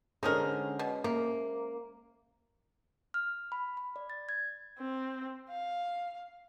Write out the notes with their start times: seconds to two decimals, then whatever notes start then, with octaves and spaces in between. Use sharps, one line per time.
0.23 D3 G#3 C#4 D#4 G#4 A#4 C5
0.79 B2
1.04 C3 A#3
3.14 F6
3.52 B5
3.77 B5
3.96 D5
4.10 A6
4.29 G#6
4.79 C4
5.50 F5